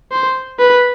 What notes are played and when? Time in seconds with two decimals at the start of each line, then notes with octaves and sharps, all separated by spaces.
0.12 C5
0.59 B4